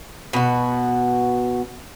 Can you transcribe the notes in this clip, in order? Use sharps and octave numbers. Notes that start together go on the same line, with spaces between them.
B2 F#4